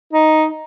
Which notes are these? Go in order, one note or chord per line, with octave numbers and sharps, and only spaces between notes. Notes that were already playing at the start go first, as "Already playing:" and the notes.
D#4